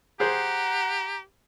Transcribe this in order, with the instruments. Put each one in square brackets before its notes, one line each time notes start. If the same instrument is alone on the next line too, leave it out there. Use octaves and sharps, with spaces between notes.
[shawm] G4 [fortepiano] G#4 C5 [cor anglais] F#5 [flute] A#5